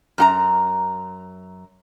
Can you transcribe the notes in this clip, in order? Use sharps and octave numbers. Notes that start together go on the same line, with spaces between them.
F#2 F#4 A#5